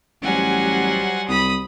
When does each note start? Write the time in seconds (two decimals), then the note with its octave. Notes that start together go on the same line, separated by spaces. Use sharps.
0.22 A1 F#3 G3 C5 F#5 G#5
1.28 C2 B5 D#6